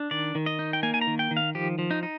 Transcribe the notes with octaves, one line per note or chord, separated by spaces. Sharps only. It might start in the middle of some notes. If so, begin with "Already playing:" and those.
Already playing: D4
D#3 D5
D#3
D#5
D#4
G5
A#3 G#5
G#5
A#5
D#3
G5
D#3
F5
F3 G4
F3
D#4
D#4